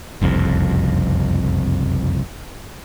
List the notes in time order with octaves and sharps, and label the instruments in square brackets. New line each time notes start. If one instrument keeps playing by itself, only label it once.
[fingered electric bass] F#1 C2 F2